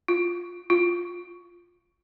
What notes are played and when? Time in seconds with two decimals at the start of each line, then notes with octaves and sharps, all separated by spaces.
0.08 F4
0.70 F4